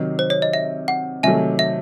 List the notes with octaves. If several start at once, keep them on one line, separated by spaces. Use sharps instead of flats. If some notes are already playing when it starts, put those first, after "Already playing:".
Already playing: C3 D#3 F#3
C5
C#5
D#5
E5
F#5
C3 D#3 F#3 A3 E5 G#5
E5